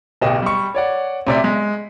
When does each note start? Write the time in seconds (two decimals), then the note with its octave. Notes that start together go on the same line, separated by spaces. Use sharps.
0.21 D1 B1 B2 G4 D#5 E7
0.42 G3 C#6
0.75 C#5 D5 F#5
1.27 D2 C3 D5 B6
1.44 G#3